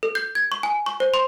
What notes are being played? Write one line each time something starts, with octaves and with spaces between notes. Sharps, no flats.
A4
G6
G#6
C#6
G#5
C#6
C5
C6